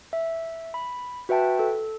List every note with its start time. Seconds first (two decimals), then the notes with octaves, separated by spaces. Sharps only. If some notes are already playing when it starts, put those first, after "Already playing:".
0.13 E5
0.74 B5
1.29 F#4 B4 E5 G5 A5
1.59 A4